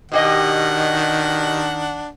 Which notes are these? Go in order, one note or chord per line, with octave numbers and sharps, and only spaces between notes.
B2 D#3 D4 G4 D#5 F#5